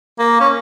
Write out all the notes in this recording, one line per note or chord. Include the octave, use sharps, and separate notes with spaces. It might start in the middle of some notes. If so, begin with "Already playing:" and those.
A#3
C#4